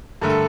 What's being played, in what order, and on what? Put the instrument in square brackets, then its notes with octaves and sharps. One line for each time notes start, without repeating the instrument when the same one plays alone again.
[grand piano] G2 D3 A3 A#4
A4